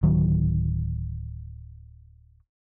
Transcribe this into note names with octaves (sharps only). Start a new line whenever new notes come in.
D1 D#3 F#3